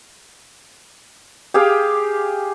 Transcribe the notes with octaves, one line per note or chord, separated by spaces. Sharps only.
G4 G#4 F5 G5